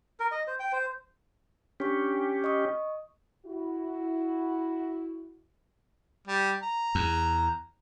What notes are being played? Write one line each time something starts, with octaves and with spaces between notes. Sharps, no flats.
A#4
D#5
C5
G5
C5
C#4 D4 G4 C#6
D#5 C#6 D#6
E4 F#4
G3
A#5
E2